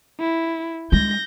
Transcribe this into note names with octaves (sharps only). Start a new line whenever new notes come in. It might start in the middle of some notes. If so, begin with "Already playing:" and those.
E4
G#3 G6 A#6